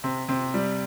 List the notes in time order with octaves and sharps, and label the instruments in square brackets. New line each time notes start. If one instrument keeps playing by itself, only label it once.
[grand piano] C3 [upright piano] C4
[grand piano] C3 [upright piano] C4
[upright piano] G3